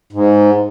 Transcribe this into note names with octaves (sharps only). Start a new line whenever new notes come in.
G#2